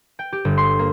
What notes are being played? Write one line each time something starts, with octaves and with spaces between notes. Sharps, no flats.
G5
G4
G1
C6
A#3